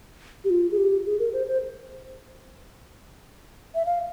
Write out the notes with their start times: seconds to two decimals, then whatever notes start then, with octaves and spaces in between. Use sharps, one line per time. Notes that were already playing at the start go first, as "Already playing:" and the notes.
0.45 G4
0.50 F4
0.71 G#4
0.77 G4
1.06 G#4
1.19 A#4
1.33 C5
1.47 C5
3.75 E5
3.86 F5